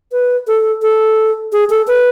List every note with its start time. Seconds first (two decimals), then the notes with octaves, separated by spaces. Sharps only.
0.12 B4
0.47 A4
0.82 A4
1.52 G#4
1.70 A4
1.87 B4